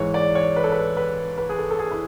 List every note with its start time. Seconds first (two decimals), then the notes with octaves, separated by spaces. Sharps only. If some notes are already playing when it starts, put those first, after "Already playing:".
Already playing: G#2 E3 C#5
0.14 D5
0.35 C#5
0.56 B4
0.64 A4
0.72 B4
0.97 B4
1.38 B4
1.49 G#4
1.58 A4
1.71 A4
1.79 G#4
1.91 E4